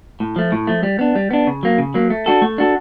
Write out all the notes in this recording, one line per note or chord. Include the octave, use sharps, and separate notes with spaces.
A2
F3 A3
A2
F3 A3
G3
B3 D4
G3
B3 D4
C#3
F#3 A#3
C#3
F#3 A#3
A3
D4 F#4 A4
A3
D4 F#4 A4